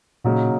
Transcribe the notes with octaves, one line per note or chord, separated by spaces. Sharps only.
A#2 C#3 F#3 A#3 D#4 F#4